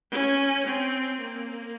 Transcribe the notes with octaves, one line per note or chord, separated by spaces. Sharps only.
C#4
C4
A#3